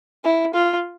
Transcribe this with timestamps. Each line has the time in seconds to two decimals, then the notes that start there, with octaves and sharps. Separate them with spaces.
0.24 E4
0.54 F4